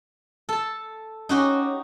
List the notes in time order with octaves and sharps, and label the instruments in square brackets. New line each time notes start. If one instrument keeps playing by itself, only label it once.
[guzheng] A4 A5
[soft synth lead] C#4 [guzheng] D#4 F#4 G4